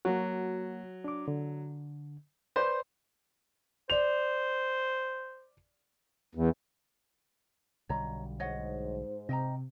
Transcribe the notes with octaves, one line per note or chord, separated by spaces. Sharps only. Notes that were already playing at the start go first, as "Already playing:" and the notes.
F#3 A#3 F#4
D4 D6
D3
B4 C5 D5 G6
C5 D5 F7
E2
B1 D3 G3 C#5 D#5 A#5
G#2 C5 C#5 D#5 F#5
C3 D#5 G5 A#5